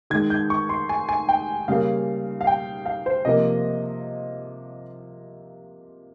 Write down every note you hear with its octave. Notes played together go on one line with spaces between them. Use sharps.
D#3 G#3 G#6
G6
C#6
C6
G#5
G#5
G5
C#3 G3 A#3 F5
F5
G5
F5
C5
C3 F3 A#3 D#5